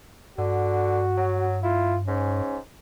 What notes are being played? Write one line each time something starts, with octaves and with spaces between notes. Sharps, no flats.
G2 D3 F#4
F#3
E4 F4
G#2 C#4